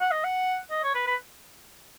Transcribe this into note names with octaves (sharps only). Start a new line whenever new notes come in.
F#5
D#5
F#5
D#5
C#5
B4
B4